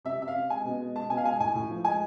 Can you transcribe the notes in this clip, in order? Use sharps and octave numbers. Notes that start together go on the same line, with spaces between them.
C3 E5
C3 E5
F5
C3
G#3 G#5
B2
G#3
G#3 A5
B2 G#5
F5
G#3 G#5
A2 G#5
A2
F3
G#3 G#5